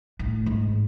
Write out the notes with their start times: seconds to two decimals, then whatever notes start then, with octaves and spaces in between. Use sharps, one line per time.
0.19 A2
0.46 G#2